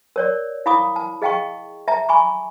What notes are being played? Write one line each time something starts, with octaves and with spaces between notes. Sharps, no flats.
A#4 C#5 D5
E4 F5 B5 D6 D#6
A5
G#4 D#5 F5 G5 A5 C#6
E5 A5 A#5
G#5 B5 C#6 D6